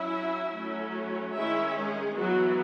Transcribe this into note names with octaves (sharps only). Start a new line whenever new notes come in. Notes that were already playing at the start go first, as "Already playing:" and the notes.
Already playing: F#3 C#4 E4 E5
F#3 A3 C#4
D#3 G#3 C#4 E4 E5
G#3 G#4
E3 F#3 G#3 B3 F#4